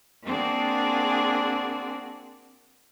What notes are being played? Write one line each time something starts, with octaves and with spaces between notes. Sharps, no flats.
A#3 C4 D4 F#4 G#4